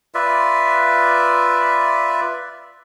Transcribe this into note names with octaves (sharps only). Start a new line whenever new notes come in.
F4 B4 D5 E5